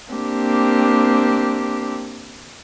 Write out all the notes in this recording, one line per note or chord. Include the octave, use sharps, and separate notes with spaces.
A#3 C4 D4 G4